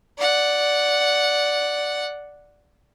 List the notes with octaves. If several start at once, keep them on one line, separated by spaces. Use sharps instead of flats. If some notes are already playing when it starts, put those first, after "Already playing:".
D5 F#5